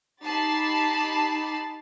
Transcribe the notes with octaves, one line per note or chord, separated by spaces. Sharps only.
D#4 G4 A5 B5 A6 C7